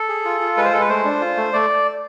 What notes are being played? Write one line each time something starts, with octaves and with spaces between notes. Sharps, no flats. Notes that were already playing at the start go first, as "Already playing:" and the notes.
Already playing: A4
G#4
F4
F4
G#3 B4
C5
G#3 A4
B4
A3 C5
D4
F4
A3
A3 D5